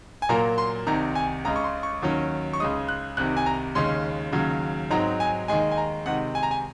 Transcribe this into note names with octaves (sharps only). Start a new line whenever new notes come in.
G#5
A#2 F#3 A#3 A#5
C6
C2 C3 D#3 A#5
G#5
C#2 C#3 G#3 A#5
C#6
C6
C#6
D#2 D#3 F#3 C#4
C#6
C#2 C#3 G#3 D#4 D#6
F#6
C2 C3 D#3 F#6
G#5
A#5
D#2 C#3 G#3 C#4 C6
D#2 C#3 F#3
G#2 F#3 C4 D#4 A#5
G#5
D#2 D#3 G#3 D#4 G#5
G#5
A#5
C3 D#3 G#3 F#5
G#5
A#5
G#5